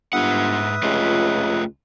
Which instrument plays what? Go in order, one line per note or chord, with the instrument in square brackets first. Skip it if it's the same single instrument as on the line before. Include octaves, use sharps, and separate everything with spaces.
[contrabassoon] G1 [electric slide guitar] G#2 F#5 [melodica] B4 E5 D#6
[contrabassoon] C#2 [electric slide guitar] A3 F4 G4